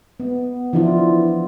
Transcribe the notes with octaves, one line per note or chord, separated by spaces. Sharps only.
B3
E3 F3 D4 E4 F4